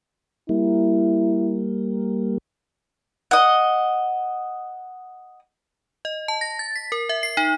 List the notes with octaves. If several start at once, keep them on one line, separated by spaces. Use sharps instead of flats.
G3 A#3 E4
D#5 F#5
D#5
A5
A#6
A6
B6
A#4
E5
C7
D#4